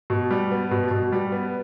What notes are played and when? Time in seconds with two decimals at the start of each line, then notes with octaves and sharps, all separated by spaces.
0.10 B2
0.31 G3
0.51 B3
0.71 B2
0.91 B2
1.12 G3
1.32 B3